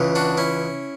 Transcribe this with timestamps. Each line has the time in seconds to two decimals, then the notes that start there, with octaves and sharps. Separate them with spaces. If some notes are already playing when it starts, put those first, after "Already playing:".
Already playing: C#2 C#3 E3
0.15 D4 F#4
0.37 C#4 E4